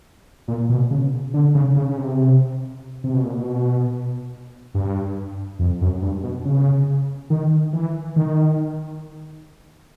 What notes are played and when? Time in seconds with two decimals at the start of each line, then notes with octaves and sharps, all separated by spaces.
0.48 A#2
0.69 B2
0.91 C#3
1.34 D3
1.55 C#3
1.76 C#3
1.88 C#3
1.97 C3
3.04 C3
3.14 B2
3.24 A#2
3.34 B2
4.74 G2
5.59 F2
5.81 F#2
6.02 G2
6.24 B2
6.45 C#3
7.30 D#3
7.73 E3
8.16 D#3